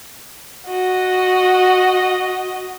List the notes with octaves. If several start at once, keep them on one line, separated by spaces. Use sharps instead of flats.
F#4 D#5